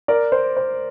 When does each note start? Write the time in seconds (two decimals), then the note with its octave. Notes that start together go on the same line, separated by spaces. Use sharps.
0.08 A#4 D5
0.32 C5
0.57 C5